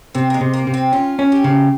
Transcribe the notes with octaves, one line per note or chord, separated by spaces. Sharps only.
C3 C4
A#3
G#3
C3
A#3
C3
C4
C#4 F4
C#4
G4
C#3